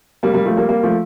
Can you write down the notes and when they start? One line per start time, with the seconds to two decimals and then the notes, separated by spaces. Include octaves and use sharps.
0.23 G3 A#3
0.34 G3 A#3
0.46 F3 A3
0.57 G3 A#3
0.69 G3 A#3
0.83 F3 A3